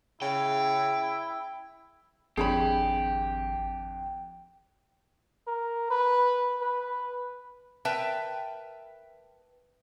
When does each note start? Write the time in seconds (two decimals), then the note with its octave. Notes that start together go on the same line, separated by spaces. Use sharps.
0.22 C#3 E4 G5
2.37 G#1 F2 D4 G4 G#4 C#5 G#5 B5
5.47 A#4
5.91 B4
6.61 B4
7.85 A#4 B4 E5 G5 A5